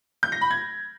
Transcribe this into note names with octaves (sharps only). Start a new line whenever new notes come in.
G6
A#6
B5
G#6